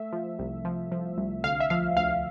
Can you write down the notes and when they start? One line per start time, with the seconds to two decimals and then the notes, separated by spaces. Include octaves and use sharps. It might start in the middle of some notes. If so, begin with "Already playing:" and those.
Already playing: A3 E5
0.13 F3
0.39 C2
0.65 F3
0.92 F3
1.18 C2
1.44 D2 F5
1.60 E5
1.70 F3 F5
1.97 D2 F5